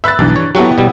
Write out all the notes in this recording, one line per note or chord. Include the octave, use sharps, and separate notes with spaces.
B4 E5 E6 F#6 A6
B1 G2 E3
C#5
F#3 B3 E4 F#4 G4 A4
B2 G3